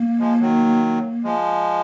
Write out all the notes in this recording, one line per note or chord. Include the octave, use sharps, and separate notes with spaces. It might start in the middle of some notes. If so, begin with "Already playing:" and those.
Already playing: A#3
F3 G#3
D#3 F#3
F3 G#3